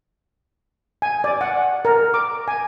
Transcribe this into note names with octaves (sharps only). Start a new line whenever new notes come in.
G#5
D5
F#5
A#4
D6
G#5